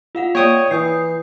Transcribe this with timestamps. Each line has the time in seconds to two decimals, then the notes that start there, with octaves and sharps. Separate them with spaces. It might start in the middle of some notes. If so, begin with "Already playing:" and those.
0.15 F4 F5 F#5
0.35 A#3 C#5 D5 G5 D#6
0.71 E3 D#6 G6 C7